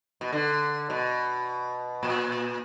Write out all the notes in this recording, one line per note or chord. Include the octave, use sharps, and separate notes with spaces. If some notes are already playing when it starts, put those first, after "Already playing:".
B2
D3
B2
A#2